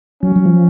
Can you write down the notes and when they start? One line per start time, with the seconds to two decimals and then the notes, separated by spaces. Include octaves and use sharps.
0.23 F#3 C#4
0.36 F#3
0.46 F3